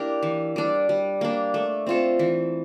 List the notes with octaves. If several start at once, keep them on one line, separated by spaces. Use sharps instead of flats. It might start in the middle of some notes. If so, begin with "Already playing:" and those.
Already playing: A#3 D4 E4 G4 A#4
E3
G3 D4
G3
A#3 D4
A3
C4 F4 A4
E3